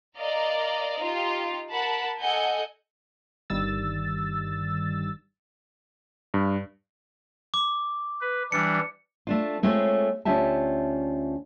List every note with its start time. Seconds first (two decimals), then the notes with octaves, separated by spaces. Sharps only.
0.18 A#4 D5 D#5 F5 A#5
1.03 D#4 F4 G4
1.72 A#4 F#5 A5 B5
2.21 A4 D#5 F#5 G#5 G6
3.50 G1 G2 D#3 G3 E6 A6
6.34 G2
7.54 D6
8.21 B4
8.52 E3 G3 D4 C#7
9.27 A3 D4 F4
9.63 G#3 A3 C4 F4 G#4 C#5
10.25 D2 C#4 F4 G4 E5 A5